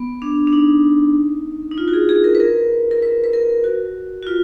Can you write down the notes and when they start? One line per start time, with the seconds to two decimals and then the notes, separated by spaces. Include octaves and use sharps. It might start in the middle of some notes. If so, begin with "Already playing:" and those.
Already playing: B3
0.22 D4
0.47 D4
0.53 D#4
1.71 D#4
1.78 F4
1.88 F#4
1.93 G#4
2.09 G#4
2.24 A#4
2.35 B4
2.40 A#4
2.91 A#4
3.02 B4
3.24 B4
3.33 A#4
3.64 F#4
4.23 F#4
4.27 F4